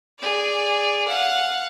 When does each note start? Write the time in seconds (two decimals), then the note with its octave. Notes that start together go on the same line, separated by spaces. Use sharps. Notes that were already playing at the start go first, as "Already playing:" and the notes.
0.19 G#4 D5
1.07 F5 F#5